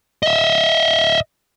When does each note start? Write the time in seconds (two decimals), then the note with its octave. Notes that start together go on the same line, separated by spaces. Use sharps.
0.23 D#5 E5